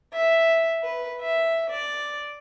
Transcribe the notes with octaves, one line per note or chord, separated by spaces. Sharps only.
E5
B4
E5
D5